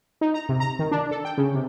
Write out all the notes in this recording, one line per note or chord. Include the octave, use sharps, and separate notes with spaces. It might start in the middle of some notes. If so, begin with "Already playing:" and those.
D#4
A#5
C3
A#5
D#3
D4
A4
G5
C#3
C3